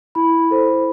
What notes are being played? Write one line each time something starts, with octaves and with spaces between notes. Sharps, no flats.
E4 B5
A4 C5